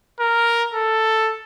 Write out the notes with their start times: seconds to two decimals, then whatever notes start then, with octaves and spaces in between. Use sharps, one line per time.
0.20 A#4
0.74 A4